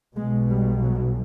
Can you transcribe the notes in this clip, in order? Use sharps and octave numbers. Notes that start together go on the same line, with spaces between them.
B1 B2 G#3
G3
F#3